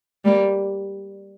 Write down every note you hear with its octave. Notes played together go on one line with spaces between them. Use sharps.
G3 A#3